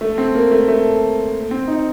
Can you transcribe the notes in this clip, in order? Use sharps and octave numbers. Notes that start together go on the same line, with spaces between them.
A3
C4
A#3
A3
A3
C4
D#4